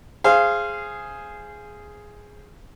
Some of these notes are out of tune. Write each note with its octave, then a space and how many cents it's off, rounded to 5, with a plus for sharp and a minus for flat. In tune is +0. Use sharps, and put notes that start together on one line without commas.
G#4 +0 C5 +5 F5 -20